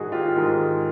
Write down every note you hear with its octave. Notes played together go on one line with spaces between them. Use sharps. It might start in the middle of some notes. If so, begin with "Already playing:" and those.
Already playing: G#2 D#3 G#3 F#4 G#4
F4 G4
G#2 D#3 G#3